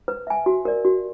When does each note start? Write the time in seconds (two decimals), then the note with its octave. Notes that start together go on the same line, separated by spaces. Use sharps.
0.08 B4
0.27 E5 G#5
0.46 F#4
0.65 A#4 D5
0.85 F#4